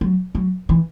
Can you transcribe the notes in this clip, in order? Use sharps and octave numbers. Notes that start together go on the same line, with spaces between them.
F#3
F#3
E3